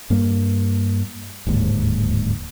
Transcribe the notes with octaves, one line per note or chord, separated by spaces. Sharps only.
G2 G3 A#3
D1 D#2 G#2